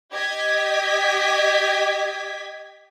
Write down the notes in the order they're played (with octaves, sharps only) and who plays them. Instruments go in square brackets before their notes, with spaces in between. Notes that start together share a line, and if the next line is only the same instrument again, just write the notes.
[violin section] G4 D#5 G#6 B6